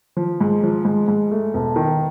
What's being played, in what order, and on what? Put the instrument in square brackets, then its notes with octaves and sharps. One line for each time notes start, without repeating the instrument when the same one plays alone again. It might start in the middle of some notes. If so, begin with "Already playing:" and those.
[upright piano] F3
G#2
F3
G#2
G#2
A3
E1
D#3